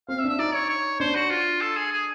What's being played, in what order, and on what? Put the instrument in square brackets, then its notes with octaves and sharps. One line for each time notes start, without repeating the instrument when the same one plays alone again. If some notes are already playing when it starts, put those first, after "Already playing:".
[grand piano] C4 [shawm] F5
[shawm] E5
[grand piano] D4
[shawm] E5
[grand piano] D#4 [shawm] D5
[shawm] C#5
C#5
[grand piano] D4 [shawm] C5
[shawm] F#4
F4
A4
G#4
G#4